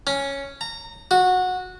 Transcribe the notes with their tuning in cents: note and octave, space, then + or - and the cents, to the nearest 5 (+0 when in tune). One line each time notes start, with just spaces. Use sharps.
C#4 +0
A#5 -20
F#4 -15